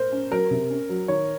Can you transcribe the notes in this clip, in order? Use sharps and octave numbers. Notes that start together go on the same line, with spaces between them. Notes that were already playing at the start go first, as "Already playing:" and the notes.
Already playing: A#4 C5
C#4
F#3 A#4
C3
C#4
F#3
D#3 C#5